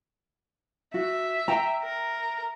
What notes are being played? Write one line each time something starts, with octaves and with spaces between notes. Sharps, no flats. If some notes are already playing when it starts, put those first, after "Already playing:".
F#4 E5
G5 A#5
A#4